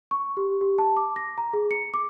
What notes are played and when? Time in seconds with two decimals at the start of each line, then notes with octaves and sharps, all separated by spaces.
0.11 C#6
0.37 G4
0.61 G4
0.78 A5
0.97 D6
1.16 A#6
1.38 A#5
1.53 G#4
1.71 C#7
1.94 D6